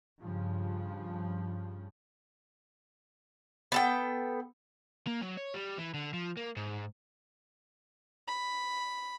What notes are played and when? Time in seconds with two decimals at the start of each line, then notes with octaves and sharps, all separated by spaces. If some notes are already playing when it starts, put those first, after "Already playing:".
0.21 G2 C#3 F3
3.72 B3 A4 G5
5.07 A#3
5.21 F#3
5.37 C#5
5.54 G3
5.78 E3
5.94 D3
6.14 F3
6.37 A#3
6.56 G#2
8.28 B5